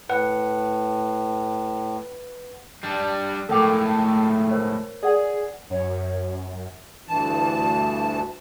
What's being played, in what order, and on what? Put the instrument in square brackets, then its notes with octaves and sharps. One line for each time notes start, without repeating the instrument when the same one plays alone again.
[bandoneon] A2 [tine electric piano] B4 F#5
[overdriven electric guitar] G3 D4
[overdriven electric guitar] C#2 A2 [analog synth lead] A3 [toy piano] A#4 G5 D6
[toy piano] A#4 C5 C#5
[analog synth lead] G#4 [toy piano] D5 F#5
[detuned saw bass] F#2 [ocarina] C#5
[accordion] D2 G2 E3 A5